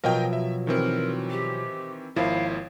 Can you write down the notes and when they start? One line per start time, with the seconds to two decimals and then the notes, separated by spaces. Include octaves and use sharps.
0.04 B2 F3 F#3 A#4 D#5 G5
0.33 E5
0.67 D#3 E3 C4 A#4
1.31 G4
2.16 G#1 D#2 F3 E4 F5